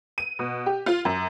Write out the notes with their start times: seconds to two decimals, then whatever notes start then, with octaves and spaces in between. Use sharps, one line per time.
0.18 D#7
0.39 B2
0.66 G4
0.86 F4
1.05 F#2